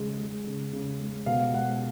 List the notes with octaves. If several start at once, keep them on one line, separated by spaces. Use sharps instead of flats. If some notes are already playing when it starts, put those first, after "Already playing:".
Already playing: C#3 G#3
G#3
C#3
C#3
G#3
B2 F5
G#3 F#5